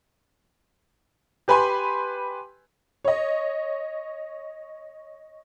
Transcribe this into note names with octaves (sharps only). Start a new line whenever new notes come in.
G4 B4 G#5 B5 C6
C#5 D#5